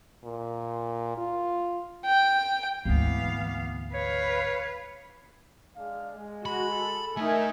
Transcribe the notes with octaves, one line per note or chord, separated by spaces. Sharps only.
A#2
F4
G5
G#1 D2 E3 B3 F5
B4 C#5 F5
G#3 D4 F5
G#3
F#4 B5
A4
A3 D#4 A#4 E5 G#5